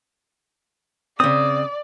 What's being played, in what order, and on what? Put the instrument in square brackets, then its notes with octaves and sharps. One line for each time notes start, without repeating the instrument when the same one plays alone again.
[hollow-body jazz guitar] C#3 C4 [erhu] D5 [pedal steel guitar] D#6